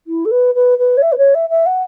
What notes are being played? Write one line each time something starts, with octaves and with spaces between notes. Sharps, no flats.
E4
A4
B4
B4
B4
C#5
E5
B4
C#5
E5
E5
F#5